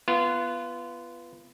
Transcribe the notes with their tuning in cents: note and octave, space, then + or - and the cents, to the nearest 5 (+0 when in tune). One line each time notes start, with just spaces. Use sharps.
B3 +0 F4 -25